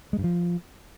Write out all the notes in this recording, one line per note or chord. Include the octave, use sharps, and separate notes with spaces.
G#3
G2
F3